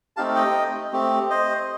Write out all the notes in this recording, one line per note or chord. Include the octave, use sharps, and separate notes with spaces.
A3 C4 D#4 G4 F5 A5
D#5 G5
A3 C4 G4
C5 D#5